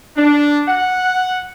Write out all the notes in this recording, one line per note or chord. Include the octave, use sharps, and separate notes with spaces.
D4
F#5